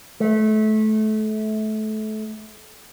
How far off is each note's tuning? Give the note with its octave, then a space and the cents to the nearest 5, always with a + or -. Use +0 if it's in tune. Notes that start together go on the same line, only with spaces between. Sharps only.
A3 -25